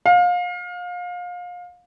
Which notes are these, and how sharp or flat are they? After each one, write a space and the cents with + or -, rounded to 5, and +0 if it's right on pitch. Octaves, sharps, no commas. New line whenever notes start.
F5 +30